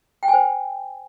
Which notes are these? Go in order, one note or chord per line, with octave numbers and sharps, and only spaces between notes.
G5
G#5
C5